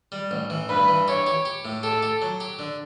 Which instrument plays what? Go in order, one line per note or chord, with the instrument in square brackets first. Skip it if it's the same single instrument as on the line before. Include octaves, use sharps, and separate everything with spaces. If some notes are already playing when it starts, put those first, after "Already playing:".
[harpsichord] G3
A1
E3
[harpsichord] G2 [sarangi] B4
[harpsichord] E3
[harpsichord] G4 [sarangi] C#5
[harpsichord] G4
G4
A2
[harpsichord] G4 [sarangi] A4
[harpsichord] G4
F#3
G4
D3